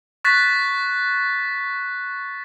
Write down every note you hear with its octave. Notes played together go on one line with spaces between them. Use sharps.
C#6 F#6 A6 B6